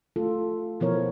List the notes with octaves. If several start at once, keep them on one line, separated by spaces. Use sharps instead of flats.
A3 F4 A4
B2 F3 B3 E4 A#4 C#5